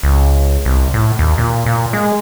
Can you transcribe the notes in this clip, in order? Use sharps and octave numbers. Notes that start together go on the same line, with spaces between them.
C#2
C2
A2
D#2
A#2
A#2
G#3